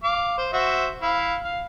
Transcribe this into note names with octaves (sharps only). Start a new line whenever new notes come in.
F5 D6
C5
F#4 C5 E5
E4 F5
F5